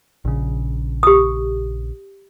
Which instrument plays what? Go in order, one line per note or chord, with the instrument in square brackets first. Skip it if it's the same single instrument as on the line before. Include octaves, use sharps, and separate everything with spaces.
[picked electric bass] A#1 C#3
[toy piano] G4 D#6